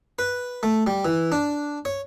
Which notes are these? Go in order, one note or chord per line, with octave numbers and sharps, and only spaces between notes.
B4
A3
G3
E3
D4
C#5